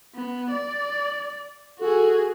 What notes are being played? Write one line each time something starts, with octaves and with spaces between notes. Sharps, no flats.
B3
D5
F#4 G#4 A4